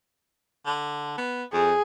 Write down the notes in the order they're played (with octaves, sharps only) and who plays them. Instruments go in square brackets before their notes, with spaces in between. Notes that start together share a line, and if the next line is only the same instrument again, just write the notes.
[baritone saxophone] D3
B3
[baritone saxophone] F2 [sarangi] G#4